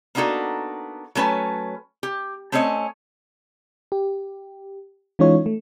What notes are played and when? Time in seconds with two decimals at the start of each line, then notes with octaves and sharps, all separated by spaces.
0.15 A#3 B3 D4 D#4 F#4 A4
1.15 F#3 A3 C#4 B4 A5
2.03 G4
2.52 A3 C4 C#4 C#5 D#5
3.92 G4
5.19 E3 G#3 C#4 D#4 F4 C#5
5.46 A3